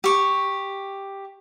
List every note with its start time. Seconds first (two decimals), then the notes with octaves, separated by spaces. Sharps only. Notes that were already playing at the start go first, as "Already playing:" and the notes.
0.04 G4 C#6